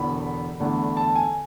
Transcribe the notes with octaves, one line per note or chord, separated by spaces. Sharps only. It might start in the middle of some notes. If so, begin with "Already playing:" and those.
Already playing: E1 E2 D3 B5
E2 D3 A3 D4
A5
G#5